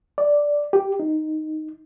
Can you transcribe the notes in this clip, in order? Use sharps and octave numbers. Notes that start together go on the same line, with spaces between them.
D5
G4
D#4